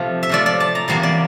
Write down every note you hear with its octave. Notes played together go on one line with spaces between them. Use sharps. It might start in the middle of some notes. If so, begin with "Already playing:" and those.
Already playing: C3 F3 A3
E5
C3 F3 A3 D5
D5
A5
A#5
E2 C3 G3 A#3 A5
D5